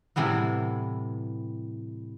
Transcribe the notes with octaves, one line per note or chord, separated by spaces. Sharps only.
A2 C3 E3 G3 B3